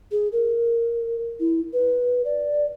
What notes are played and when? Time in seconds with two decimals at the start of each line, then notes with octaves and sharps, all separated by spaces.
0.12 G#4
0.32 A#4
1.40 E4
1.73 B4
2.25 D5